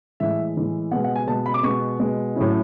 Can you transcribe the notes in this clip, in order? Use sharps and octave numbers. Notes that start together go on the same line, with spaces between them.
A2 E3 G#3 E5
A2 E3 G#3
B2 G#3 B3 F#5
F#5
G#5
B2 G#3 B3 A5
B5
D6
B2 G#3 B3 C#6
B2 G#3 B3
A2 F#3 C#4 E4